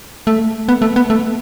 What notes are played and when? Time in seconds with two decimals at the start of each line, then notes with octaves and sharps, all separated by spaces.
0.27 A3
0.69 B3
0.82 A3
0.96 B3
1.10 A3